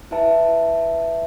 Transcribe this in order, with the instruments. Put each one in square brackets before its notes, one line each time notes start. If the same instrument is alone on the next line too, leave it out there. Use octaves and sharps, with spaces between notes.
[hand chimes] E4 B4 E5 A5